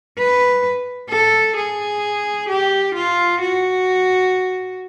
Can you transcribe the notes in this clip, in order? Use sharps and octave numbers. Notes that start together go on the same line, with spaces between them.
B4
A4
G#4
G4
F4
F#4